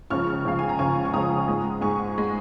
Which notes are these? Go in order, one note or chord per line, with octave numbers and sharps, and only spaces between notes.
C#2 C#3 F3 C#6 F6
C#2 C#3 F3 F5
G#5
A#5
C#2 C#3 F3 G#5 C#6
C#6
C#2 C#3 F3 A#5 D#6
G#2 G#3
G#2 G#3 G#5 C#6
G#3